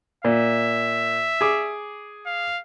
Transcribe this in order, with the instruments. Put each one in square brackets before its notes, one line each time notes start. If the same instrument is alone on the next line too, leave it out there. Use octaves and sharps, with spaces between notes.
[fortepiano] A#2 [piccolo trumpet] E5
[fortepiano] G#4 D6
[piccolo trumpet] F5